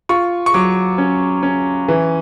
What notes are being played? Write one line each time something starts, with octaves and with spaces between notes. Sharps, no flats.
F4 C#6
C#6
F#3 D6
C#4
C#4
E3